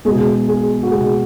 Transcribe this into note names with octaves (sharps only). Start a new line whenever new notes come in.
B2 G#3 G#4
G#4
F#4
B2 G#3 G#4